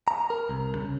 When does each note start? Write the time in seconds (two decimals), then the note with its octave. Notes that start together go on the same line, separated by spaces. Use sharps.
0.08 A#5
0.30 A#4
0.49 C2
0.75 C#3